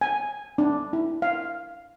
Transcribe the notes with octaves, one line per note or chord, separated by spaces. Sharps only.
G#5
D4
E4
F5